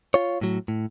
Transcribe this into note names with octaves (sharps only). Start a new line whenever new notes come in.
F4 C#5
A2 F#3
A2